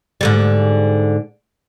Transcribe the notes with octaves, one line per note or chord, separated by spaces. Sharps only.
G#2 D3 G3